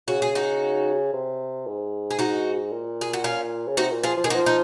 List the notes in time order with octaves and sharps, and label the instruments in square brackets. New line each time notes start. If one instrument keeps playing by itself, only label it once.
[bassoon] C#3 [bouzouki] F#4
[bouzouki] G#4
D#4 F#4
[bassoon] C3
G#2
[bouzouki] G#4
D#4 F#4
[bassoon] A#2
[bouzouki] G#4
F#4
C#4 F4
[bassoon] C#3
[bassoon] C3 [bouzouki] D#4 F#4
[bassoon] A#2
[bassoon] F3 [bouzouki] F4 G#4
[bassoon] F3
[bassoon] D#3 [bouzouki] G#4
[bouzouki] D#4 F#4
[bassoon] F3
[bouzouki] D#4